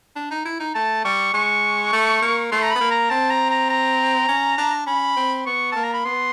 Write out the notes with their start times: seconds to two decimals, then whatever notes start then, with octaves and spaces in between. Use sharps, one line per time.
0.16 D4
0.30 D#4
0.45 E4
0.60 D#4
0.75 A3 A5
1.05 G3 C#6
1.33 G#3 C#6
1.93 A3
2.22 A#3
2.51 A3 C6
2.63 A#5
2.71 B3 B5
2.80 A#3
2.91 A#5
3.10 C4 A5
3.30 A#5
3.50 A#5
3.70 A#5
4.28 C#4
4.58 D4
4.87 C#4 B5
5.16 C4
5.46 B3 C#6
5.72 A#3 A5
5.83 A#5
5.94 B5
6.05 B3 C6